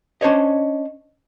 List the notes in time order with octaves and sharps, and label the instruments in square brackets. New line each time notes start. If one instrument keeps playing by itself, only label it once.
[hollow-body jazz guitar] C#4 D4 C5 C#5 D#5